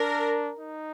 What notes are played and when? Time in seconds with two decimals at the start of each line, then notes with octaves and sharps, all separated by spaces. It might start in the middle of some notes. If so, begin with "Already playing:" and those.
Already playing: D4 A#4
0.59 D#4